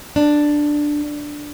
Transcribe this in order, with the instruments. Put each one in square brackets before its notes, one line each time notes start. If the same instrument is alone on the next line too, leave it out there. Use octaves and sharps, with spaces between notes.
[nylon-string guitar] D4